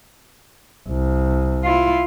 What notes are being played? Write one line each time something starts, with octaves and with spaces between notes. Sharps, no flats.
C2
E4 F4